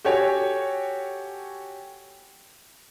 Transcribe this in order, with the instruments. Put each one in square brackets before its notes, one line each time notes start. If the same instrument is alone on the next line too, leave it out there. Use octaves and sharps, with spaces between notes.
[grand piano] F#4 G4 A4 C#5 G#5